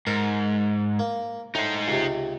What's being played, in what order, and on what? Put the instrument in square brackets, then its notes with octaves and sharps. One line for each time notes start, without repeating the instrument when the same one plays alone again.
[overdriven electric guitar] G#2 [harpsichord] A#4
[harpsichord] A#3
[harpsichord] A2 [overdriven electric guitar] D#4 C5
[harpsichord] C#2 C3